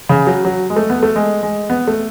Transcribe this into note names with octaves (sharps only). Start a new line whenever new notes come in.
C#3
F#3
F#3
G#3
A3
B3
A3
G#3
G#3
B3
A3